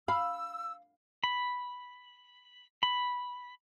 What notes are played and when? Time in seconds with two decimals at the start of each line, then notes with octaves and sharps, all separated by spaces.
0.08 F5 B5 E6
1.24 B5
2.83 B5